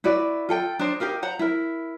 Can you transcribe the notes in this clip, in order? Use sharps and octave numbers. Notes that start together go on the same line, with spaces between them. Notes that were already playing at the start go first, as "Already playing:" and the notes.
E4 F#4 B4 D5
F4 A4 G5
D4 D#4 A#4 C5
D#4 G4 A#4 F5
C5 F#5 A#5
E4 A#4